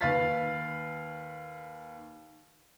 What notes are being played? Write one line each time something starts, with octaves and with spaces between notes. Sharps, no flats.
D#2 B4 F5 F6 A6 B6